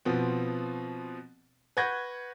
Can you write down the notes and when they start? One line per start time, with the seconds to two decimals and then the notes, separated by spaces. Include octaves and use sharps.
0.05 B2 F3 B3 C4
1.77 B4 F#5 C#6 G6 G#6 A#6